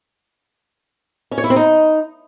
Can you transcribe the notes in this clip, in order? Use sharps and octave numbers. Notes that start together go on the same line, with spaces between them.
C#4
C#5
E4
C4
D#4